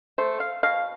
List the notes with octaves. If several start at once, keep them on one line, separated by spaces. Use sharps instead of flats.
A3 C5
F5
B2 F5